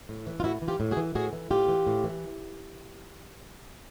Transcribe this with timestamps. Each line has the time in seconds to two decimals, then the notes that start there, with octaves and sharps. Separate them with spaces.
0.09 A2
0.27 E3
0.40 F4
0.44 A2 E4 F#4
0.62 E3
0.68 F4 G4
0.80 A2
0.91 F#4 G#4
0.97 E3
1.15 A2 F#4 G#4
1.33 E3
1.51 A2 F4 G4
1.68 E3
1.87 A2
2.04 E3